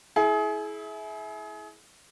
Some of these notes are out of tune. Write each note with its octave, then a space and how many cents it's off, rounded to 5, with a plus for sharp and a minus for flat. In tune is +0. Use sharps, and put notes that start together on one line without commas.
E4 -15 G#4 +30